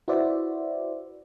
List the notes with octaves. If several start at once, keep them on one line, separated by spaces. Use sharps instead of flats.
E4 F#4 B4 C5 D5 E5